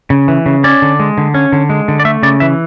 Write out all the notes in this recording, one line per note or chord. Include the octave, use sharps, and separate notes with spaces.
C#3
E3
C#3
C#4 D5
D3
G#3
D3
C#4
D3
G#3
D3
D5
A3 E5
C#3 D5
E3 E5